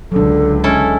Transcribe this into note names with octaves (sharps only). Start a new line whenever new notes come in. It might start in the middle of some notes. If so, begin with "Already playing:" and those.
C#2 D3 F#3 D4 A4
G#3 C#4 E4 A4